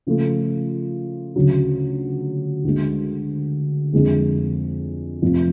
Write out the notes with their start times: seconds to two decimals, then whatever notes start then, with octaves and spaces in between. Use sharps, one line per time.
0.07 C#3 F3 A3 F4
1.36 D2 C#3 F#3
2.64 D2 D3 G#3
3.93 F2 D3 G#3 D4 G#4
5.22 F1 F2 F3